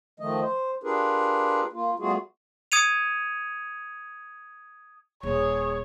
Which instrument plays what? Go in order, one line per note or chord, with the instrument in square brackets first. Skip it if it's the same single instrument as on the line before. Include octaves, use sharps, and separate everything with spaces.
[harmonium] D#3 F3 A3 D#5
C5
D4 F4 G4 G#4 A#4 B4
A#3 F4
G3 A3 B3 F4 F#4 G#4
[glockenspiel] D#6 G#6 C#7 D#7 F7
[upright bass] D#1 [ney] G#4 [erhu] C#5